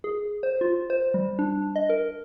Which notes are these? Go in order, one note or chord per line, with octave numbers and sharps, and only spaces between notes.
G#4
C5
F4
C5
G3
D4
D#5
A#4